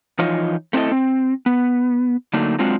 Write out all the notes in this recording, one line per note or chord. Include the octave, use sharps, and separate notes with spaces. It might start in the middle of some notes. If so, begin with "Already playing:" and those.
E3 F3 D#4 F4 C#5 D#5
A3 C4 D4 E4 A4 D#5
C4
B3
D3 F#3 A3 A#3 D4 D#4
F#3 G#3 C4 D4 F4 F#4